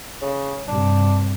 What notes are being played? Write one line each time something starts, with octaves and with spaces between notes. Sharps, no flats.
C#3
G2 C3 D4